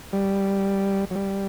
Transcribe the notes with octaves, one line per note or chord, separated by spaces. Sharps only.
G3
F#3
G3